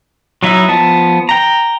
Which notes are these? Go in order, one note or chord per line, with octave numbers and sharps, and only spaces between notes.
F#3 D#4 E4 E5
F3 B3 A5
G5 A#5